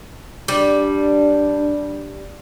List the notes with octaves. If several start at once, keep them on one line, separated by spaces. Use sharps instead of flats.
G3 D4